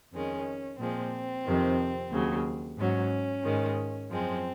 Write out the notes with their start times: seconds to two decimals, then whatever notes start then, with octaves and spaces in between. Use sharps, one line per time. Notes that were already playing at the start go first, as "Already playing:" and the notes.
0.13 F2 D#3 G#3 C#4
0.79 A#2 F3 G#3 C4
1.46 F2 C3 D#3
2.12 D#2 C#3 F#3
2.78 G#2 F#3 C#4
3.45 G#2 D#3 G#3
4.11 F#2 F3 G#3 C4